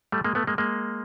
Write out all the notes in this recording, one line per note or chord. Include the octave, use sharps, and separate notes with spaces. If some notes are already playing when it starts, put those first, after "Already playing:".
G3 A3
G#3 A#3
A3 B3
G#3 A#3
G#3 A#3